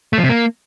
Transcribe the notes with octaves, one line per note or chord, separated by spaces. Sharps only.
A3
F3
C3
A#3